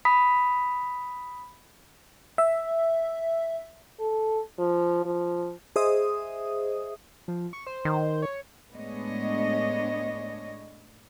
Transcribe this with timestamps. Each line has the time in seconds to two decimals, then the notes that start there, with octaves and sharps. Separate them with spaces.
0.05 B5 D#6 B6
2.38 E5
3.99 A4
4.58 F3
5.06 F3
5.76 G#4 C5 D#5 E5 D#6
7.28 F3
7.53 C#6
7.67 C5
7.85 D#3
8.22 C#5
8.73 A2 G#3 B3 D4 C#5 D#5